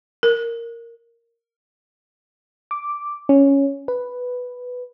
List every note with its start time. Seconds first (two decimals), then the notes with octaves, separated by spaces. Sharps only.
0.23 A#4
2.71 D6
3.29 C#4
3.88 B4